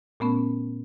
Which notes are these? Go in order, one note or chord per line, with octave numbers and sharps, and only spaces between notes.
A#2 A3 B3 C#4